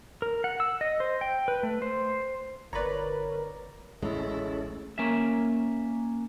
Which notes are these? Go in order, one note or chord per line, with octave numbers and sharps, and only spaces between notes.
A#4
F#5
E6
D#5
C5
G5
B4
A3
C5
G1 A#4 B4 C#5 D5 A#5 B5
A1 D2 A2 G#3 C#4 E4 A4
A#3 C#4 E5